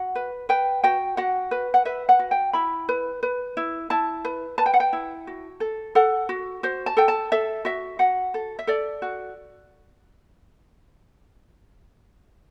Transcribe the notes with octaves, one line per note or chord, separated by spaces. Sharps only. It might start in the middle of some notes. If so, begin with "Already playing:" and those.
Already playing: F#4 F#5
B4
B4 G5
F#4 G5
F#4 F#5
B4
F#5
B4 E5
F#5
F#4
G5
E4 B5
B4
B4
E4
E4 A5
B4
B4 A5
G5
F#5
G5
E4
F#4
A4
A4 F#5
F#4
F#4 C5
A5
A4 G5
A5
A4 E5
F#4 E5
F#4 F#5
A4
E5
A4 D5
F#4